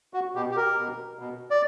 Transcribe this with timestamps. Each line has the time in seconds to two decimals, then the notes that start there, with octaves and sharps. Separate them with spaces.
0.14 F#4
0.35 B2 G4
0.51 G4
0.56 A#4
0.78 B2
1.19 B2
1.50 D5